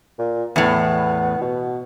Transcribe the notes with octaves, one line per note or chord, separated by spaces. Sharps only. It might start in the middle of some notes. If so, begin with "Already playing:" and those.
A#2
E2 A2 B3
B2